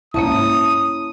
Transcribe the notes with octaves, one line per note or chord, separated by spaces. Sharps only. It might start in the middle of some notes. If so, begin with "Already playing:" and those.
C2 G#2 A#3 C#4 E4 C#5 A5 D#6